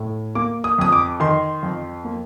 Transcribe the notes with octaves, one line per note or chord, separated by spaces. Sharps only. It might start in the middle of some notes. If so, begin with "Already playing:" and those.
Already playing: A2
A#3 D6
D#6
F2 D#6
D6
D#3 C6
F2
A#3